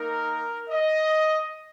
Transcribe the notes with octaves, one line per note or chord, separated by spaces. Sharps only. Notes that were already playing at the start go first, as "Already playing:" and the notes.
Already playing: A#3 D#4 A#4
D#5